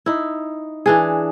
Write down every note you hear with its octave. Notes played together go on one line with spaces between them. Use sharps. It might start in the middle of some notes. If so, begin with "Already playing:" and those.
D#4 E4
E3 D4 G#4